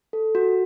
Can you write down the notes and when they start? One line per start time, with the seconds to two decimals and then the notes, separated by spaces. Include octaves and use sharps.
0.13 A4
0.35 F#4